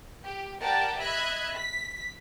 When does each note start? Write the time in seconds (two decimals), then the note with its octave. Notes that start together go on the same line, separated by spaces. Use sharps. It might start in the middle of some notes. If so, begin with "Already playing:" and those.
0.24 G4
0.61 G4 A#4 D5 F#5 G5 A5
0.99 D#5 E5 B5 F#6 G#6
1.54 B6